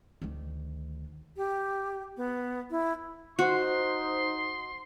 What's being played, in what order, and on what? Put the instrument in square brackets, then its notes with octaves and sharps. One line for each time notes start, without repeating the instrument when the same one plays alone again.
[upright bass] D2 D#3
[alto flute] G4
B3
E4
[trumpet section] D#4 [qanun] F#4 [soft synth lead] C5 [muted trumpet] C6